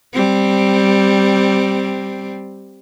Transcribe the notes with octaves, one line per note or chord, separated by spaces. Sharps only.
G3 C4